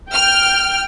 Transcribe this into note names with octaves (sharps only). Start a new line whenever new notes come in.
G5 F6